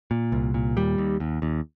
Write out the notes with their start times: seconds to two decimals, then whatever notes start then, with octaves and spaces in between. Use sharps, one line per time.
0.11 A#2
0.32 C2
0.54 A#2
0.76 D#2 G3
0.98 D#2
1.20 D#2
1.42 D#2